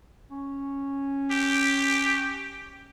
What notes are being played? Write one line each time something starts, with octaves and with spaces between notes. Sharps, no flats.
C#4
G4